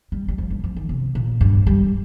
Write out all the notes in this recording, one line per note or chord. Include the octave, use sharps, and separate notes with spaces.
G3
G3
F3
G2
F3
D#3
C3
A#2
G2
G3